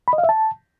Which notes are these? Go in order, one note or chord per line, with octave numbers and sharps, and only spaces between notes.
B5
D#5
F5
E5
A5